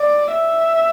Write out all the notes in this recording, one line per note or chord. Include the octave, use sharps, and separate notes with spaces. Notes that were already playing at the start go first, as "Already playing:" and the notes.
Already playing: D5
E5